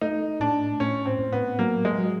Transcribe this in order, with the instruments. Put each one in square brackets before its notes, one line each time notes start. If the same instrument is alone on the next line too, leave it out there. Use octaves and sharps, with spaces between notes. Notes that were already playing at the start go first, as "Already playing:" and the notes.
[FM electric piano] A3 [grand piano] D#4
[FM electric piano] A2 [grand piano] D4
[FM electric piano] A2 [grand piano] C#4
[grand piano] C4
[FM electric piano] A2
[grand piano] B3
[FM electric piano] F#3 [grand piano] A#3
[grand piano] G#3
[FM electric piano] F#3